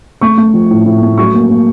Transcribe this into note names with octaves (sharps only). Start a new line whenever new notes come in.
A3 C#6
A3
F3
A2
A2
A3
F#3 C#6
A#3
A#3